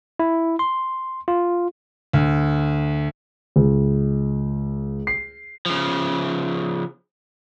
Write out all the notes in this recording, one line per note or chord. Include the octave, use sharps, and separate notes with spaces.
E4
C6
F4
D2
C#2
C7
C#3 F3